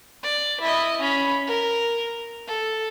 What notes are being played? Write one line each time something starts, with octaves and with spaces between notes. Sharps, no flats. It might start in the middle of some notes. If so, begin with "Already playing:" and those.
D5
E4 D#5
C#4 B5
A#4
A4